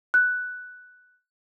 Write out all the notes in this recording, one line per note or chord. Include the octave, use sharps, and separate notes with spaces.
F#6